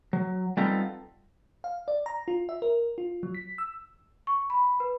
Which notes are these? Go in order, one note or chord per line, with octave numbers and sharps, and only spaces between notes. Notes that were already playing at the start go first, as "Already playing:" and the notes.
F#3
G3 B3 C4 D#4 F4 A4
F5
D5
A#5
F4
E5
A#4
F4
F#3
B6
E6
C#6
B5
B4